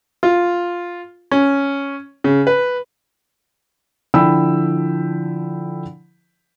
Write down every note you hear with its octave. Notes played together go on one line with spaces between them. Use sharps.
F4
C#4
C#3
B4
D3 F3 E4 G5 B5 E6